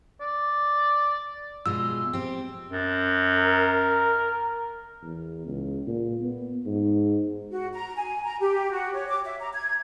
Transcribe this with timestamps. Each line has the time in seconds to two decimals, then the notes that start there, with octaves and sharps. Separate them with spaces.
0.21 D5
1.66 B2 G#3 F4 E6
2.13 C4 G4
2.70 F#2
3.38 A#4
5.02 E2
5.47 C#2
5.87 A#2
6.21 B3
6.66 G#2
7.51 F#4
7.73 A#5
7.96 G#5
8.24 A#5
8.40 G4
8.71 F#4
8.94 C#5
9.08 D6
9.25 E5
9.40 A#5
9.54 G#6